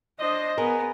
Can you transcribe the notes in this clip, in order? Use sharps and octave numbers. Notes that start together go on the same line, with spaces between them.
D4 C5 D#5
B3 G#4 A#4